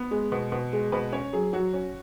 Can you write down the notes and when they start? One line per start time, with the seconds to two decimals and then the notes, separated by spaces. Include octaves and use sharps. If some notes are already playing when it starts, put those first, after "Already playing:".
Already playing: B3
0.11 G#3
0.32 B2
0.52 B2
0.73 G#3
0.92 B2 B4
1.13 C#4 C#5
1.33 F#3 G#4
1.53 F#3 F#4
1.73 C#4